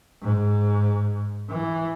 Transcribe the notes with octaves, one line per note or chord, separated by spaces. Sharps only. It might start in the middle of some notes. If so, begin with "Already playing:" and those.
G#2
E3